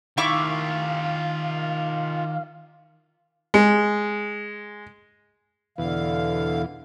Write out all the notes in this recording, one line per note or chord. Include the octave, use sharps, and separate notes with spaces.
D#3 E4 F4 G4 F5 C#6 D6
G#3
E2 B2 D3 E3 F5